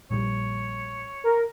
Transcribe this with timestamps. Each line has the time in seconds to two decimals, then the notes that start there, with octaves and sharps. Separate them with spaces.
0.11 A#1 G3 C#5
1.24 A#4